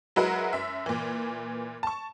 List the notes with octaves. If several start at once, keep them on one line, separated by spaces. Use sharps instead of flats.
F#3 G#3 E4 F#4 A#4 B4
F#2 E5
A#2 E3
A5 C#6